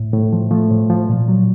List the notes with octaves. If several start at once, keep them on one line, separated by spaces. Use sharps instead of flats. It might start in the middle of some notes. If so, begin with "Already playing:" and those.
Already playing: A2
A2
F3
F3 A3
A2
F3
A#2
F#3